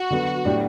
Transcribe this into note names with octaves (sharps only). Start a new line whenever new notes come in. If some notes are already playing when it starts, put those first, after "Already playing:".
Already playing: F#4
D3 F#3 B3
A2 F#3 B3 D4 G4